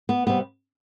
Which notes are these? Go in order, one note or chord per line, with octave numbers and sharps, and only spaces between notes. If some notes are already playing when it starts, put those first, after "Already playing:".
B3
C3 G3 B3